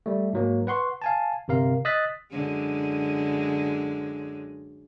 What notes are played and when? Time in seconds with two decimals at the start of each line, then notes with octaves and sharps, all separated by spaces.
0.06 G3 A3
0.33 G#2 F#3 A#3
0.67 B4 F#5 C6 C#6
1.02 F5 G#5 A5
1.48 G1 C3 A#4 F5
1.85 D#5 D#6 E6 F#6 A6 B6
2.31 F#2 D3 G#3